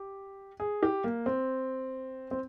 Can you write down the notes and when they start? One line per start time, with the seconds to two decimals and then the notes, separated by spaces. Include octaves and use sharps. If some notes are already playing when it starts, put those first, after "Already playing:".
Already playing: G4
0.60 G#4
0.83 G4
1.04 A#3
1.26 C4
2.31 C4